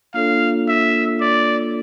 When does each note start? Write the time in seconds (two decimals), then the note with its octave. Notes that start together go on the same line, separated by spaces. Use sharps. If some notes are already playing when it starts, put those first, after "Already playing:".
0.14 A#3 D4 F4 A4 C#5 F5
0.68 E5
1.21 D5